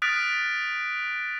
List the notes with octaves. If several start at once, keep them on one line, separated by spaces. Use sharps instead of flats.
D#6 F6 F#6 A6 B6 D7